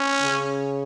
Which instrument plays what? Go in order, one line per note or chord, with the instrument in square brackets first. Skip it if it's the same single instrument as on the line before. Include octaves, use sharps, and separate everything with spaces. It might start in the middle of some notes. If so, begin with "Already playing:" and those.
Already playing: [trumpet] C#4
[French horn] C#3